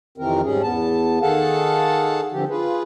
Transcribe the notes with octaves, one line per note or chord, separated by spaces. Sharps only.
F2 C3 D#3 E3 C4 A#4
G#2 G3 C#4 G#4
E2 B3 A5
D#3 G#4 A4 F5 F#5 A5
G2 D3 F3 C4 G4
F4 G#4 B4